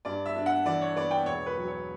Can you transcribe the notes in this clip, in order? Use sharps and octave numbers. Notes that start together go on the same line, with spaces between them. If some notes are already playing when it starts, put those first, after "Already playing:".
G2 D5
E5
D4
F#5
E3 D5
C#5
B3 D5
G5
E1 C#5
B4
F#3
C#5